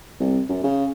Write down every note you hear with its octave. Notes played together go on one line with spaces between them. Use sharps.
C2
F#2
C#3